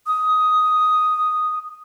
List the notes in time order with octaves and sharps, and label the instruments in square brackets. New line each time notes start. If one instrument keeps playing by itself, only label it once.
[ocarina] D#6